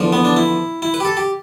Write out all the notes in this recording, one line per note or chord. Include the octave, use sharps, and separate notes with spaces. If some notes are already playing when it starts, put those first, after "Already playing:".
Already playing: E2 D3 F3
B3
D4
E4
E4
B4
G4
A4
G4